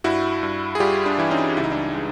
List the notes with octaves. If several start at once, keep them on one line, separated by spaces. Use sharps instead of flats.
G2 E4 F#4
G2
G#4
G3 F4 G4
D4
E3 E4
C#4 D#4
C#2 E4
D#4
D4 E4
G#3